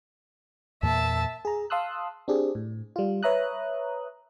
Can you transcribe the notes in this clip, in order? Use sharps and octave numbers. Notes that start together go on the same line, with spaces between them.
E2 A#2 A#3 E5 A5
G#4 A#5
F5 A5 C6 D#6 E6 F#6
C4 D4 G4 G#4
A2
G3 F4
B4 C#5 E5 A#5 D#6 F#6